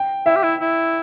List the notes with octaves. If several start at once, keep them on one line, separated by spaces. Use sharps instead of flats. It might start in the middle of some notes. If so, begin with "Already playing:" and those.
Already playing: G5
E4 E5
G4
E4
E4